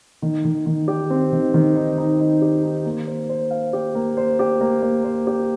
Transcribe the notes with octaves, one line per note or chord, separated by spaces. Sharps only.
D#3
D#3
D#3
G4
C4
D#3
D#3
D#4
D#4
D#4
G4
D#4
A#3
C5
C5
F5
G4
A#3
C5
G4
A#3
A#3
C5
G4